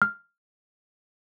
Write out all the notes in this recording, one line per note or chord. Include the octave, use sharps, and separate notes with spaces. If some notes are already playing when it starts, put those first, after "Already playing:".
F6